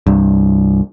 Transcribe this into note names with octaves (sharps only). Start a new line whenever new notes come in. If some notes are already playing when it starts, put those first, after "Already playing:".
C2 G2